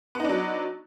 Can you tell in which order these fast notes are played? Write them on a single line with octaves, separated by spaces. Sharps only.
B3 D#4 D4 F#3